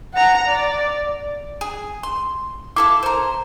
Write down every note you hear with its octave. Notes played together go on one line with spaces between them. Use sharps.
F#5 A#5
D5
G#4
C6
E4 A4 F5 D6
A#4 C5